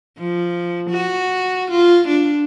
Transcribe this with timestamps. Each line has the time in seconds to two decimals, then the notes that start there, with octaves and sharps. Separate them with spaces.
0.18 F3
0.90 F#4
1.71 F4
2.08 D4